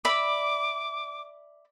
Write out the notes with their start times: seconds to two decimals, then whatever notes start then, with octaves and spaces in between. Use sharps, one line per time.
0.05 D5 E5 B5 D6